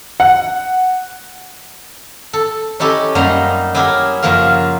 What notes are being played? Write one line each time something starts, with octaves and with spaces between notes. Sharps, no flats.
F#5
A4
C#4 D#4 E4 G4 A4
F#2 G3 A#3 D#4 C5 A#5
F#3 E4 G4 G#4 A#4
F#2 C#3 F3 A#3 F4 A#4